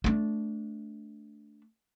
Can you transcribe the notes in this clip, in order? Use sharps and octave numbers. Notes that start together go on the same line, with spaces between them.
A3 D4